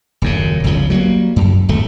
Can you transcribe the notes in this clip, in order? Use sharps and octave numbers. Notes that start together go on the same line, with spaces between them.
D#1 F#2 C#3
G1 C#2 C#3 F3
F#3 G3 A3 A#3
F#2
D1 G#1 A3